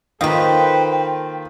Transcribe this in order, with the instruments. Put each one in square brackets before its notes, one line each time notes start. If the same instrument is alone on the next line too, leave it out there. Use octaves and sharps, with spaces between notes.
[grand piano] D#3 F4 [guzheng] A#3 D#4 [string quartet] A4 B4 C5 [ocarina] G5